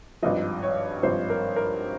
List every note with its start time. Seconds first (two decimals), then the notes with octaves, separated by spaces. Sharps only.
0.22 G#1 G2 F3 D#5
0.63 C#5
1.03 G#1 G2 F3 C5
1.30 A#4
1.56 A#4